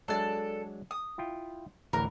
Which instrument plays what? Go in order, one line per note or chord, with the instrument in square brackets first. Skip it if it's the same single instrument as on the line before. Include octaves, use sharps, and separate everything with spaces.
[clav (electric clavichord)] F#3 G#3 D4 [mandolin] A4 D5
[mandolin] D#6
[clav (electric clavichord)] E4 F4 G5
[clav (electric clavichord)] A1 D2 E3 [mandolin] A#4